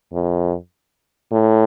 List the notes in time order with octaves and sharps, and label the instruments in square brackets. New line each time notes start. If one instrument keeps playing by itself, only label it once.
[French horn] F2
A2